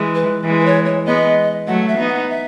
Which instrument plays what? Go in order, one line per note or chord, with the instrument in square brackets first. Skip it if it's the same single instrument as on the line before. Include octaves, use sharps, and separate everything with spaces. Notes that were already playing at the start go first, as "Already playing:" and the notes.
Already playing: [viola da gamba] E3 G#3
[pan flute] B4
[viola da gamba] E3 G#3
[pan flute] B4
C#5
C#5
[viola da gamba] G#3 B3 [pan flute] D#5
[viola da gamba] F#3 A3 [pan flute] F#5
[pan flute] E5
[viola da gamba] B3 D#4
[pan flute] F#5
E5